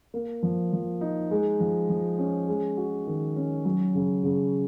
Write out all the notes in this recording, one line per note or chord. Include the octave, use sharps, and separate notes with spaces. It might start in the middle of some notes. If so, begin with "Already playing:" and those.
A#3
F3
F3
D#4
G#3
F3
F3
C#4
G#3
F#4
D#3
C#4
F#3
C#3
C#3